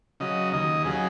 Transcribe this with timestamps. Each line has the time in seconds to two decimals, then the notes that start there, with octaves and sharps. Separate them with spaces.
0.20 C#3 F#3 D#5
0.53 D#2 D#5
0.85 C#3 F#3 G#4